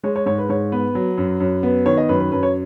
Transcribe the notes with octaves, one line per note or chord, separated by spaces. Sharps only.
G#3 C#5
C#5
G#2 C#5
B4
G#2 C#5
B3 B4
F#3
F#2
F#2
B3
D#3 C#5
D#5
F#2 B4
B4
F#2 B4
C#5